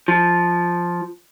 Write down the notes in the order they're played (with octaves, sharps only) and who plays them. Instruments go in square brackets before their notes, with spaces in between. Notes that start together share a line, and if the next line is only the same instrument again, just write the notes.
[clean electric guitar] F3